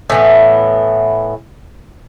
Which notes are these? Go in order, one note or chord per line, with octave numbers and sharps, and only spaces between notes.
A2 E3 B3